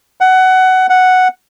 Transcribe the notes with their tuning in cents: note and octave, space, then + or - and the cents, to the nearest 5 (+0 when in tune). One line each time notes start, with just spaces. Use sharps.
F#5 +15
F#5 +0